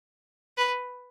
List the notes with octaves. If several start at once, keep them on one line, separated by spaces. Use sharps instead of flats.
B4